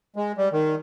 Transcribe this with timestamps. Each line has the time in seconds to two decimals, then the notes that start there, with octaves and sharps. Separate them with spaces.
0.16 G#3
0.38 G3
0.53 D#3